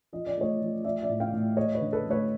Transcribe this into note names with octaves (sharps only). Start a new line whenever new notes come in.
F3 D#5
D5
A3 C#5 D#5
F3
F3 D5 E5
D5 E5
A2
F5 G5
A2
A3 C#5 D#5
B4 C#5
D3
A4 B4
A3
B4 C#5